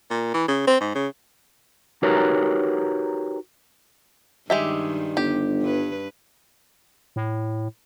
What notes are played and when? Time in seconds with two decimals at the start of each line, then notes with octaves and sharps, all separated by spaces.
0.11 A#2
0.34 E3
0.48 C#3
0.68 C4
0.81 G#2
0.95 C#3
2.03 D#4 F#4 G4 A#4 B4 C#5
4.50 G2 D#3 G3 G#3 G4 E5
5.17 G1 G4
5.61 G2 B4
7.16 A2